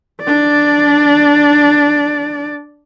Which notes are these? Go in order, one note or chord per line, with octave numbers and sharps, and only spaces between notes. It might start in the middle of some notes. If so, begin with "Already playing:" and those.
D4 D5